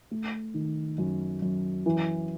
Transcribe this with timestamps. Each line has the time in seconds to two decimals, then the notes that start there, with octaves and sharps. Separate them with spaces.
0.11 A3
0.54 D#3
0.98 F#2
1.42 F#2
1.86 E3